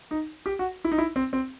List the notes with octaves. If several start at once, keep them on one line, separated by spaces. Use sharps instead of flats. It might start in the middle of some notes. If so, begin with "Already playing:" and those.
D#4
G4
F#4
E4
D#4
E4
C4
C4